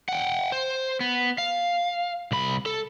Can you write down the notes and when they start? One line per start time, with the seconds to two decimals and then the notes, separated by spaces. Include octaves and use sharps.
0.09 F#5 G5
0.52 C5
1.00 B3
1.38 F5
2.32 C2 B5
2.66 A4